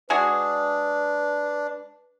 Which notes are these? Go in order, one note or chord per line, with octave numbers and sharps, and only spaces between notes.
G#3 D4 F#4 G#4 B4